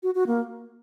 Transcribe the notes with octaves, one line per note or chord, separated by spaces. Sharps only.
F#4
F#4
A#3